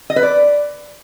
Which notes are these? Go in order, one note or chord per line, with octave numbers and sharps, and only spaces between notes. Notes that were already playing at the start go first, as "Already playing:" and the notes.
D#5
B4
D5